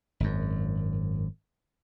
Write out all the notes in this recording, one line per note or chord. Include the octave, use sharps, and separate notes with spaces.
G#1 F#2